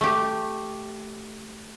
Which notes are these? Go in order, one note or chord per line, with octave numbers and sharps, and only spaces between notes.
A3 G4